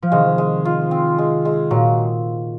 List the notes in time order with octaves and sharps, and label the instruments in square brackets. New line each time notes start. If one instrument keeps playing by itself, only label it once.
[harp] F3
[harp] C3 D#3 [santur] G#3
[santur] G#3
F4
C4
G#3
G#3
[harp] A#2 [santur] F#3